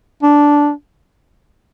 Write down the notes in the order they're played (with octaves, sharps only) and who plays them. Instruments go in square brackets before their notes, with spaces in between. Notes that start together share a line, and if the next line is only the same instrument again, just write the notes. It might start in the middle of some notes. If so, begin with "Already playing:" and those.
[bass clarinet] D4